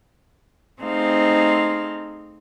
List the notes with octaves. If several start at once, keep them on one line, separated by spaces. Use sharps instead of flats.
A3 C4 D#4 G#4 C5 F5